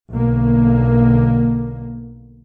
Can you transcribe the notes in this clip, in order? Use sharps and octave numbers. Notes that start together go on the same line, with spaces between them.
B1 D3 A#3